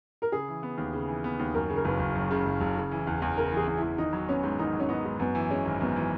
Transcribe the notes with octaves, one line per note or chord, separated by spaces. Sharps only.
A#4
C#3 G#4
E3
B3
D#2
C#3
E3
B3
D#2
F#2 A#4
C#3
A#4
F#1 B4
F#1
F#2
C#3
F#1
F#1
C#3
E3
E2
E2
C#3 A#4
E3 G#4
E2
E4
E2
D#3 D#4
F#3
B3 C#4
G#2
D#3 D#4
F#3
C#4
B3 D#4
G#2
F#2 B3
E3
G#3 C#4
G#1
F#2 B3
E3